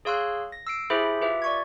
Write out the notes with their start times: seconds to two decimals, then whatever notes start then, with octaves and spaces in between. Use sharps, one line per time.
0.05 G#4 C#5 F5 C6 E6 F#6
0.52 A#6
0.67 E6 C7 D7
0.90 E4 G4 G#4 C5 E5 B5
1.21 F4 G4 B4 E5
1.42 D5 C#6 G#6